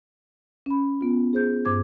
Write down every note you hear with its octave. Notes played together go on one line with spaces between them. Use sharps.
C#4 B5
B3 F4
G#4 C5 G6
G2 C5 D6 G#6